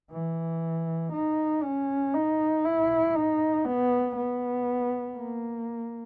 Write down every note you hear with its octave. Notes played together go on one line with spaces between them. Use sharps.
E3
D#4
C#4
D#4
E4
D#4
B3
B3
A#3